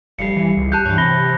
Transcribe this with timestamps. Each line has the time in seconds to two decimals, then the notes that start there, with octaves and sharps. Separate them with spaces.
0.19 F1 G2 G3 C7 C#7
0.36 E3
0.57 C#2
0.72 G4 A5 F#6 G6
0.85 G2 E3 C#4
0.98 C3 B5 A#6 G7